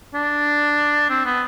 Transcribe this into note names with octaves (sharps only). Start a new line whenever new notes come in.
D4
C4
B3